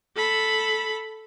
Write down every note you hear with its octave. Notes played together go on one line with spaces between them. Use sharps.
A4 B5